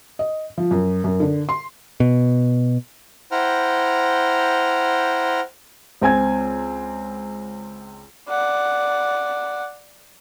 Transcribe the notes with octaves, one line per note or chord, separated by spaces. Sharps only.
D#5
F3
F#2
F#2
D3
C6
B2
E4 C5 F#5 G5 A#5 F6
C#2 C4 G#5 G#6
D5 F#5